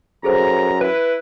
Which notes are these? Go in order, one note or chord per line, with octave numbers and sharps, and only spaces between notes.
F#2 G#4 A4 C5 A#5
E4 B4 F#6